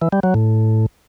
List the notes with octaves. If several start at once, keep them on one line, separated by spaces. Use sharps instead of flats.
E3
G3
F#3
A2